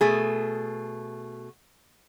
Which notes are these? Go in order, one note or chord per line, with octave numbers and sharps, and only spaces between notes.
B2 A3 G#4